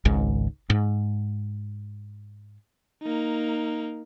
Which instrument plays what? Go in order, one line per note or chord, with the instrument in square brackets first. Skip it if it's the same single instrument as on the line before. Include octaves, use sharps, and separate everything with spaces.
[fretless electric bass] G#1 C#2 G#2
G#2
[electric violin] A#3 D#4